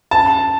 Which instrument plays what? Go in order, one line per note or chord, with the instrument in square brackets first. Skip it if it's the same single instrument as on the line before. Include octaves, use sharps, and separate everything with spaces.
[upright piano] A5